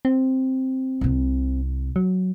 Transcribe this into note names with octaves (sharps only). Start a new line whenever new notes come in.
C4
C2 C3
F#3